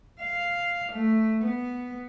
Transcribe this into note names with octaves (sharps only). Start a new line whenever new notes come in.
F5
A3
B3